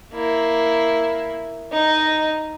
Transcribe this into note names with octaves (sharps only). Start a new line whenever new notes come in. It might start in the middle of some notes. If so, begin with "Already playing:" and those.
A#3 E4
D#4 D#5